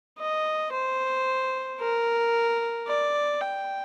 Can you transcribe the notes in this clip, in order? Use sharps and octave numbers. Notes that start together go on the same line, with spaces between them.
D#5
C5
A#4
D5
G5